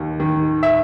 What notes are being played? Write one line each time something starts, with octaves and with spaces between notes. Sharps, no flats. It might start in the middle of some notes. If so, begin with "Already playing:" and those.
Already playing: D#2 D#3
D#3
E5